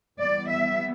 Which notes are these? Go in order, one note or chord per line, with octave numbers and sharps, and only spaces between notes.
E3 G3 B3 D5
E5